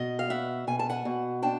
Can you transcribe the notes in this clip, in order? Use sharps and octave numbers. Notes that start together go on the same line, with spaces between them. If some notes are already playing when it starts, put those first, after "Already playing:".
Already playing: B2 D#5
F5
B2 E5 F#5
B2 G#5
A5
F#5 G#5
B2
D4 G5 A5